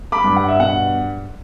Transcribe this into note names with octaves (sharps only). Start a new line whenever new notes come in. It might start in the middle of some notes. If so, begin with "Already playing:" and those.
B5 D6
G2
F#5
E5
B2 F#5